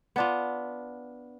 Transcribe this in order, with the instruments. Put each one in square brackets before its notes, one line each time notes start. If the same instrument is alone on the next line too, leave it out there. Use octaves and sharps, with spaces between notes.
[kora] B3 D4 F4